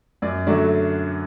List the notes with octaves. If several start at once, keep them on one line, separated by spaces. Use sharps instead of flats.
F#2 D5
D3 F#3 A3 D5